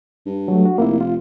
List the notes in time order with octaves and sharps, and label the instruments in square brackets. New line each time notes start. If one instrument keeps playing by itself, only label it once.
[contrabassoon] G2
[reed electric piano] F#3 A3
F#4
[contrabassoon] F1 [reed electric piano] A#3 E4
[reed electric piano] F4